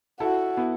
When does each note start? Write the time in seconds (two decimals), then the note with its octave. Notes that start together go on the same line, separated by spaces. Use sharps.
0.20 E4 F#4 A4
0.57 B3 E4